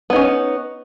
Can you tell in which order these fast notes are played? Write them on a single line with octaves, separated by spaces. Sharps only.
B3 D#4 C#4